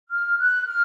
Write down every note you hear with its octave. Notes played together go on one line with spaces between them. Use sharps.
F6
F#6
F6